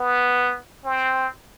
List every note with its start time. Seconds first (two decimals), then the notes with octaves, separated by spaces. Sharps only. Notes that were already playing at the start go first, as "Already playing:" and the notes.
Already playing: B3
0.85 C4